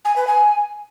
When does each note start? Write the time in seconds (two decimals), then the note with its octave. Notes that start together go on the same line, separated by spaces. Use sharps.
0.05 G#5
0.16 B4
0.27 G#5